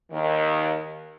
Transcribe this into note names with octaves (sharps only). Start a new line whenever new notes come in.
D#2 D#3